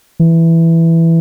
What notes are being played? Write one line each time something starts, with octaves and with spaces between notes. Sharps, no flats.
E3